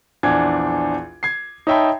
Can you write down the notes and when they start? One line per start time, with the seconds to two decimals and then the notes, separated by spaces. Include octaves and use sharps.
0.23 A#1 E2 D4 G#6
1.23 G#6 C7
1.67 D#4 C#5 E5 G5 A5 B5